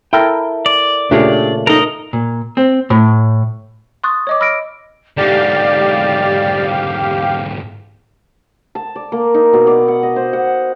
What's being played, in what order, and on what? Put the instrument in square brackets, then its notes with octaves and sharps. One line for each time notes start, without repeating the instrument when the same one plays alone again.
[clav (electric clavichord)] E4 A4 A#4 [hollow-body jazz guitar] G5
[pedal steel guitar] D5
[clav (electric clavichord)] A#2 C#3 A3 [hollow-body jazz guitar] D4 G4 G#4
[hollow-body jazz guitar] D#4 A4 [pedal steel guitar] A#4 D#5
[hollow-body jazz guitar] A#2
C4
A2
[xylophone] C6 C#6 D#6 F#6 A6
C#5 D#5 D6
B5 E6 F6 A#6 D7
[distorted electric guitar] G#2 D3 [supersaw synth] G4 F5 [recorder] D5
[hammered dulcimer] A5
D5
A#3
D#4
B2
D5
F#5
D#5
C5
F#5